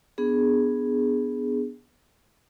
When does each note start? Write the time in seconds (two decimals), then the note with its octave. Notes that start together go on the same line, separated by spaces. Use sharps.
0.18 B3 D4 G#4